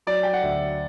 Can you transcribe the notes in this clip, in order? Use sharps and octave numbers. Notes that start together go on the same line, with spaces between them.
F#3 D5
G5
F#5
D2 E5